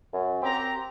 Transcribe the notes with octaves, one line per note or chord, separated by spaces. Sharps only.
F#2
C4 G4 A#5